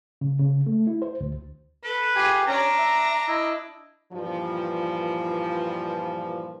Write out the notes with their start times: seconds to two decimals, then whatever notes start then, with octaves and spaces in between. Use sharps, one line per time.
0.21 C#3
0.40 C#3
0.66 A3
0.87 E4
1.02 C5
1.21 D2
1.83 A4 B4
2.15 F4 G4 G#4 G#5
2.47 C#4 D4 A#5
2.78 E5
3.28 E4 D#5
4.13 G2 A#2 E3 F3